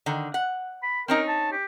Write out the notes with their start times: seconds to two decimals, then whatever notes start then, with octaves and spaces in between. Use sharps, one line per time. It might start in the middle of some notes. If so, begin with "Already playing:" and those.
0.06 D3 D#3
0.34 F#5
0.83 B5
1.08 C4 C#4 D#4 A#4
1.28 A5
1.52 G4